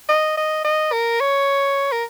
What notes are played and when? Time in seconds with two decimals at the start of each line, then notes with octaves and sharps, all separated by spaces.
0.09 D#5
0.37 D#5
0.65 D#5
0.92 A#4
1.21 C#5
1.92 A#4